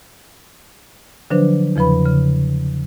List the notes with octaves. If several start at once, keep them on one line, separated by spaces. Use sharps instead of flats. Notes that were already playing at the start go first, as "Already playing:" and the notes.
D3 F3 F#3 D4 B4 C5
E2 C#3 F3 B4 B5
C#3